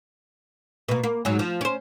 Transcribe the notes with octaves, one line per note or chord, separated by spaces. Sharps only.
B2 A#3
A#3
G#2 F#3
F3
C#4 C5